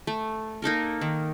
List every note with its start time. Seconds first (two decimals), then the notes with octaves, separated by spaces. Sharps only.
0.07 A3
0.62 A#3 D#4 A4 A#4
1.01 D#3